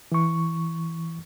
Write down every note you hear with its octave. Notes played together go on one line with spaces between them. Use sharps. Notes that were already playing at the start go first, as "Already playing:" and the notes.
E3 C#6